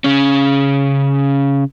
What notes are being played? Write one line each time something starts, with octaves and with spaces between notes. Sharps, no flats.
C#3 C#4